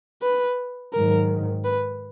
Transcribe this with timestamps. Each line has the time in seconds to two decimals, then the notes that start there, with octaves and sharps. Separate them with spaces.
0.22 B4
0.93 G#2 D#3 F#3 A#4
1.65 B4